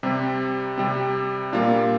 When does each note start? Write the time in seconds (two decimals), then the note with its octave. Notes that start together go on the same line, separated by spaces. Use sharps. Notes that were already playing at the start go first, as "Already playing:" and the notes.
0.03 C3 G3 C4
0.78 C3 G3 C4
1.53 A#2 G3 A#3 D4 F4